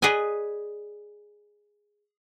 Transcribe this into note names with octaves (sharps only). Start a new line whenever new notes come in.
G#4 B4 D5 D#5 G#5